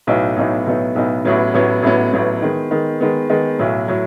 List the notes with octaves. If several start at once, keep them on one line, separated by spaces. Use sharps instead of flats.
B1 A2 F#3 B3 D#4
B1 A2 F#3 B3 D#4
B1 A2 F#3 B3 D#4
B1 A2 F#3 B3 D#4
A1 A2 F#3 B3
A1 A2 F#3 B3
A1 A2 F#3 B3
A1 A2 F#3 B3
D#3 G#3 B3
D#3 G#3 B3
D#3 G#3 B3
D#3 G#3 B3
B1 A2 F#3
A2 F#3